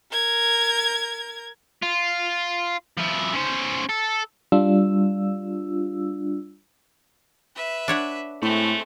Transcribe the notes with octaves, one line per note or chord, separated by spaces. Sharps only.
A#4 G#6
F4
F3 E4
C#4 C5
A4
G3 D4 F4 E6
B4 E5
D4 C#5 F#5
A2 G#3 A3 C4